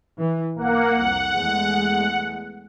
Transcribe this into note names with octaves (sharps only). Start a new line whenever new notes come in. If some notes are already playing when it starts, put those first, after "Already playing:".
E3
B1 A#3 F#5
C2 F2 F#5
E2 G#3 A3